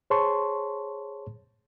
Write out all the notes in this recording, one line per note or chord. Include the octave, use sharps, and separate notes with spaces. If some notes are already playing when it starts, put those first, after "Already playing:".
G#4 C5 C#5 A5 C6 C#6